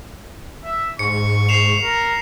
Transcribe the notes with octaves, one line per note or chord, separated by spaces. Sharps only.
E5
G#2 C#6 C#7
C7 E7 F7
A#4